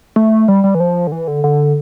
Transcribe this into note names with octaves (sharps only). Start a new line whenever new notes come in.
A3
G3
G3
E3
F3
D3
E3
D3
D3